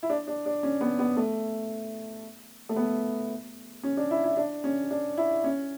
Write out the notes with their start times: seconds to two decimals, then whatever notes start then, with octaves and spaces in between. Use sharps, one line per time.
0.03 E4
0.10 D4
0.27 D4
0.46 D4
0.63 C#4
0.81 B3
0.99 B3
1.17 A3
2.69 A3
2.76 B3
3.83 C#4
3.97 D4
4.11 E4
4.24 E4
4.37 D4
4.64 C#4
4.91 D4
5.17 E4
5.44 C#4